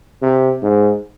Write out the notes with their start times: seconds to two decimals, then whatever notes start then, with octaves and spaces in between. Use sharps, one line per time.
0.22 C3
0.62 G#2